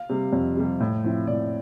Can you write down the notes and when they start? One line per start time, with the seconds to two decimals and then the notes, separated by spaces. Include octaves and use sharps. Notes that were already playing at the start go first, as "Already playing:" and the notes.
Already playing: F5
0.09 C3 G3
0.33 F2
0.57 C3 G3
0.81 A2
1.04 F3 C4 E4
1.27 A2 D5